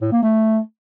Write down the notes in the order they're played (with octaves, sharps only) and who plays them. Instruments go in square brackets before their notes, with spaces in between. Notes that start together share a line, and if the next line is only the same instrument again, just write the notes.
[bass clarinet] A2
A#3
A3